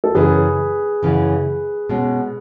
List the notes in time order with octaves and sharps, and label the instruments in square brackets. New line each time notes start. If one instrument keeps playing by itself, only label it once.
[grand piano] A4
[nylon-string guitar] F#2 C#3 E3 [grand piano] G#4 B4
[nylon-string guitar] F#2 C#3 E3
B2 G#3 C#4